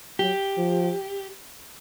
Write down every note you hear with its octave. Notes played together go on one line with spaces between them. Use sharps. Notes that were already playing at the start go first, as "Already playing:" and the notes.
F#3 G4
F3